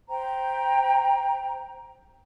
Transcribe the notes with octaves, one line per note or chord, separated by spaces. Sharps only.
C5 G5 A#5